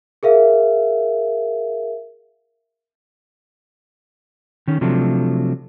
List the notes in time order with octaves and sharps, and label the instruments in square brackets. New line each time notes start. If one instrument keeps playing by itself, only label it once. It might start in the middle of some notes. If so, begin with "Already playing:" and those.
[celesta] G#4 A#4 E5 F5
[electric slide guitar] D#3 C#4
C3 F3 F#3 A3 D4